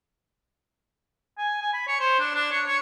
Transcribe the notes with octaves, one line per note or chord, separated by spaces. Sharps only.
G#5
G#5
B5
C#5
C5
D4
D4
C#5
C#5